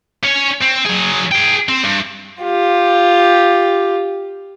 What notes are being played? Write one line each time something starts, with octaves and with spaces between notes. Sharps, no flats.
C#4 C#5
C4
F#3 G#4
G#4 G5
C4
G2
F4 G4